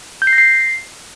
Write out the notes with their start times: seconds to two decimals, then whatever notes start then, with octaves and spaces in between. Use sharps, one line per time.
0.22 G6
0.27 C7
0.33 A#6
0.38 C7